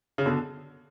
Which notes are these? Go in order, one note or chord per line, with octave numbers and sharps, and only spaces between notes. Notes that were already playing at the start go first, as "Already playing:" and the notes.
C#3
B2 D3